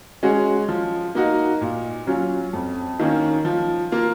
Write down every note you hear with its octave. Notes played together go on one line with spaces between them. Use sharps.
G#3 C#4 F#4
F3
A#3 D#4 F#4
A#2
F#3 C#4 F4
F2
D#3 A#3 C#4
F3
A#3 F4